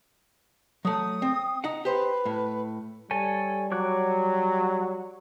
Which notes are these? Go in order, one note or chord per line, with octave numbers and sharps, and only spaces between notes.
F#3 A3 D#6
C4
D#4 F#5
G4 B4 C5
A2
G3 A4 C#5 G#5
F#3 C#5 D6 F#6